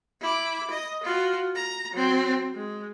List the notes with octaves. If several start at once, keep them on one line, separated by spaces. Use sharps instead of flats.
E4 D6
D#5
F4 F#4
A#5
F#3 C4
G#3